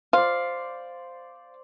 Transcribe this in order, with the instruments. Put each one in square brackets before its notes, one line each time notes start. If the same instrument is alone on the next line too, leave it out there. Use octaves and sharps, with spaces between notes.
[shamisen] F4 [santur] C5 D5 [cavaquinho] F5